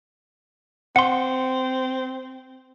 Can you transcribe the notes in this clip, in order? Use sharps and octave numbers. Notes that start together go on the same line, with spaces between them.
C4 F#5 C6